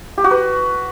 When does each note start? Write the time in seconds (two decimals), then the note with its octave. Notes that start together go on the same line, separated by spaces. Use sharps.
0.18 G4
0.24 F#4
0.31 B4